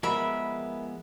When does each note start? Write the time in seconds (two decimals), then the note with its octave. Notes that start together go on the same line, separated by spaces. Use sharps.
0.03 F3 G#3 B3 A#4 E5 B5